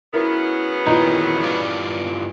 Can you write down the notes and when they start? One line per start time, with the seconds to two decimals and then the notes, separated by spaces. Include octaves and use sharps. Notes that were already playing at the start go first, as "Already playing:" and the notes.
0.14 C#3 F#3 B3 E4 A#4
0.87 E2 A#2 D#3 E3 D#4
1.43 G2 F4 D5